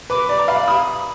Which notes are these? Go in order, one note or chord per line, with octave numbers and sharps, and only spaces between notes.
B4 D6
D5 B5
A#5
F5 B5
D#6